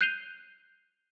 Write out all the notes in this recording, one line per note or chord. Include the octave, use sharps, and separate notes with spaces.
F#6 G6 C7 D#7 F7 G7